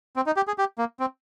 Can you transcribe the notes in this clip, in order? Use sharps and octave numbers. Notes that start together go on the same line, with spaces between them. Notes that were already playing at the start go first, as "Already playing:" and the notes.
C4
D#4
G4
G#4
G4
A#3
C4